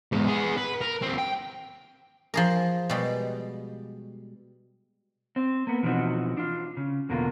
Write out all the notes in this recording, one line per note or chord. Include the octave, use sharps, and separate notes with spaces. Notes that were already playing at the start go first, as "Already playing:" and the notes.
E2 G#2
B3 G#4
B4
A#4
D#2 C4
G5
F3 G#4 A#4
B2 G3 G#3
C4
A#3 B3
B2 E3 F3 C4 D#4 F#4
D4 F4
C#3
E2 B2 D3 A#3 F4